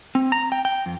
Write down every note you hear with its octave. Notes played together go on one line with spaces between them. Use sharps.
C4
A#5
G5
G5
F2